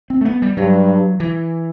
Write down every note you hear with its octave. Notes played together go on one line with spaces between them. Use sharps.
C4
A3
B3
G3
G2 F#3
E3